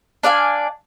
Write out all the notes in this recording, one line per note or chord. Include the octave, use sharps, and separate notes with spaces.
D4 D5 F5 G#5